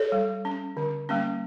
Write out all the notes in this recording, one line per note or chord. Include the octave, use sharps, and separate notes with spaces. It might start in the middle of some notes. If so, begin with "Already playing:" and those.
Already playing: A4 C#5
G3
C#4
D3
G3 A#3 C#4